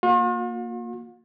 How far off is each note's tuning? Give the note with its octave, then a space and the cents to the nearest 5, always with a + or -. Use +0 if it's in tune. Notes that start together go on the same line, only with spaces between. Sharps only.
A#3 +0 F4 +45